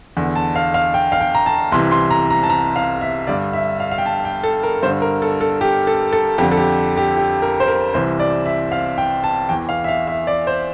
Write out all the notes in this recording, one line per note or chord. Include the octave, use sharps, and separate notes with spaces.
E2 D3
A5
F5
F5
G5
F5
G5
A#5
A5
C2 C3 E3 C6
C6
A#5
A#5
A5
A#5
F5
E5
G2 D3 D5
E5
F5
F5
G5
A5
G5
A4
A#4
G2 D3 C5
A#4
A4
A4
G4
A4
A4
F2 D3 G4
A4
G4
G4
G4
A#4
C5
A#4
C2 C3 E3 C5
D5
E5
F5
G5
A5
E2 E3 G5
F5
E5
F5
E5
D5
C5